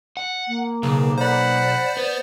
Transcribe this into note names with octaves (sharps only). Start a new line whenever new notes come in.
F#5
A#3
B1 C#3
C5 D5 F#5 B5
B3